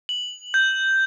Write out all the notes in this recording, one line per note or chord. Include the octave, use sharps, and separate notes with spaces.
F#7
G6